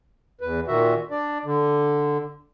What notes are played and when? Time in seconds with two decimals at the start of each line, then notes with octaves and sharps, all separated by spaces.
0.41 E2 B4
0.68 A#2 D#3 F#4 E5
1.11 D4 D5
1.45 D3